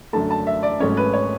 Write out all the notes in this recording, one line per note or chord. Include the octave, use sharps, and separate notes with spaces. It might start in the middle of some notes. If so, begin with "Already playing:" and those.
F#2 D3 A3 A5
A5
E5
D5
G#1 G#2 F#3 A3 C#4 C#5
B4
C#5